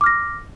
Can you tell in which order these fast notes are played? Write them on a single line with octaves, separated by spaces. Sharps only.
D6 F6 A#6